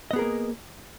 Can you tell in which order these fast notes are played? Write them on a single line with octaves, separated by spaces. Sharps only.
D#5 B3 G#4 A#4 A#3